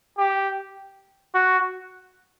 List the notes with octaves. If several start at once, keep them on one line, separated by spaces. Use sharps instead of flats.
G4
F#4